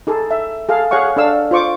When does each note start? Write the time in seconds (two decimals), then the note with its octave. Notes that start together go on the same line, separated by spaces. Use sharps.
0.07 D#4 G#4 A4
0.31 E5
0.69 G#4 A4 F5
0.91 G#4 C#5 F5 F#5 C#6
1.17 D4 A4 F5 E6
1.51 F4 C5 C#6 D6